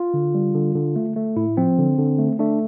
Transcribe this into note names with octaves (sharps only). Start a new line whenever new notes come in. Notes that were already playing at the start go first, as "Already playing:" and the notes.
Already playing: F4
D3
G3
D3
D3
A3
A3
A2 E4
F3 C4
D3
D3
A3
A3 D4